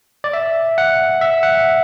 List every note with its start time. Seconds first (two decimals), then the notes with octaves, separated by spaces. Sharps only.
0.24 D5
0.33 E5
0.78 F#5
1.21 E5
1.43 F#5